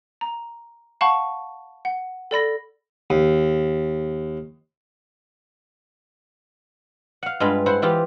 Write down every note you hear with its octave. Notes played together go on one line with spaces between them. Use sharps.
A#5
F5 F#5 A5 B5 C#6
F#5
A4 D5 B5 A#6
D#2
F5 F#5
G2 G#3 F4 B4 B5
E4 C5 F#5
E3 E4 F4 G4